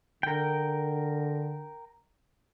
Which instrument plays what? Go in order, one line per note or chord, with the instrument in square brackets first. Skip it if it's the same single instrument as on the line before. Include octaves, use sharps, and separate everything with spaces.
[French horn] D3 [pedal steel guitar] A#4 G5